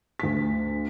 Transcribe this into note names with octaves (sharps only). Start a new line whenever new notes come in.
D2 B6